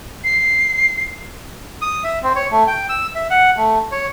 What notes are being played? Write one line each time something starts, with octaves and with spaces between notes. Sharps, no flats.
C7
D#6
E5
C4
C#5
A3
G5
E6
E5
F#5
A3
C#5